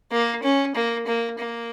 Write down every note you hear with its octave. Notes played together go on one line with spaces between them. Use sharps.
A#3
C#4
A#3
A#3
A#3